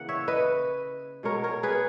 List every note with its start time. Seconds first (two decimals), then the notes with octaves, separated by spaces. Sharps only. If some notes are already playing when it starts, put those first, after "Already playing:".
Already playing: C#3 E3 A#3 F#5
0.09 C#5 E5
0.28 B4 D#5
1.23 B2 G#3 B3 A#4 C#5
1.44 A#4 C#5
1.63 G#4 B4